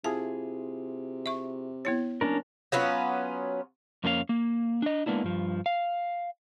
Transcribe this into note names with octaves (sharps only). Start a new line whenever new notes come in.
C3 E4 F4 G#4 A5
E5 C#6
B3 E4 C#5
F#1 C#4 D4 A#4
F#3 B3 C#4 F4
F2 A#3 C#4 D4 F5
A#3
D4 D#5
G#3 A#3 B3 D4 E4
G2 F3
F5